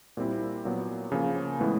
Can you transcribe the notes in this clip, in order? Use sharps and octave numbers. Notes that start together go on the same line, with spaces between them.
A#2 G3 C4 E4
A#2 F#3 B3
C#3 F3 A#3 C#4
A2 E3 G#3 B3